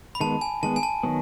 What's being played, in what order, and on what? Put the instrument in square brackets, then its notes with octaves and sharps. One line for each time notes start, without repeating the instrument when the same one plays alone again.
[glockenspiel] B5
[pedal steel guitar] D#3 G#3 B3 [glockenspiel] A5
[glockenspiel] G#5
[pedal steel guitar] D#3 G#3 B3 [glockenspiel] A5
[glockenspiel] G#5
A5
[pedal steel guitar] D#3 F#3 B3